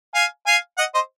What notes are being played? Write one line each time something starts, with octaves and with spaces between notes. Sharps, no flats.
F5 G#5
F5 G#5
D#5 F#5
C5 D#5